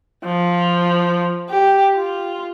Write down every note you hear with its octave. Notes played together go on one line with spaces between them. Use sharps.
F3
G4
F4